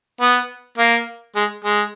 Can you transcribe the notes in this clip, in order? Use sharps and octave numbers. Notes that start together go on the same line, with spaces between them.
B3
A#3
G#3
G#3